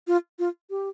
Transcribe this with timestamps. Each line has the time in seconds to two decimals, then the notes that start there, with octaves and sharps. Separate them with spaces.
0.07 F4
0.39 F4
0.70 G4